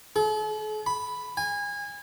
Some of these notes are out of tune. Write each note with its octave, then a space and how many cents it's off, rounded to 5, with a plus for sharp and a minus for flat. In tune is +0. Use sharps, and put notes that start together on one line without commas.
A4 -45
B5 +5
G#5 -25